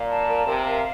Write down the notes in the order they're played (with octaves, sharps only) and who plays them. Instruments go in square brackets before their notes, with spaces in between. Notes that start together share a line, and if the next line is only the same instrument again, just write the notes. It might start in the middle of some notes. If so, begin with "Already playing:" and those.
Already playing: [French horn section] A#2 [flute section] F5
[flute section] A5
A#4
[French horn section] C3 [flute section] A#4
[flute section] F5